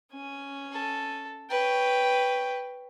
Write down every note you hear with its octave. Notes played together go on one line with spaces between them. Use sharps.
C#4 G#5
A4
B4 C#5 G5